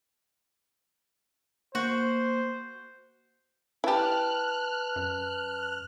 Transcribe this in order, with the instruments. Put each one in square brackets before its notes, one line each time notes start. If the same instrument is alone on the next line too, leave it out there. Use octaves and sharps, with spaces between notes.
[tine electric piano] A#3 [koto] F#4 [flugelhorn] C5
[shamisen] E4 G4 [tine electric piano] B4 A5 [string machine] F6 F#6
[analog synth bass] F#2